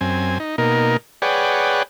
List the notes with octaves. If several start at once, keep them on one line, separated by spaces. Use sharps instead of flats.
F#2 C4 G#5
D#4
B2 A#3 D#4 A#4
G#4 B4 C#5 D5 F#5 G5